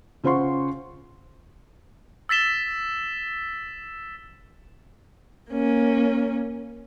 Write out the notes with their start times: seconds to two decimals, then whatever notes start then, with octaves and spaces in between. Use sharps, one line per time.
0.24 C#3 F4 C5 F#5 C6 C#6
2.29 E6 A6 B6 E7 G7
5.51 A#3 C#4